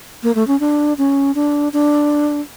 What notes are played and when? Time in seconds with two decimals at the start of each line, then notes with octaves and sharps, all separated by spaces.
0.23 A#3
0.35 A3
0.47 C#4
0.60 D4
0.98 C#4
1.35 D4
1.73 D4